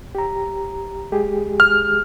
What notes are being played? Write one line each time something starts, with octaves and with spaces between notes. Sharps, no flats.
G4 A#5
G#3 G4 G#4
F6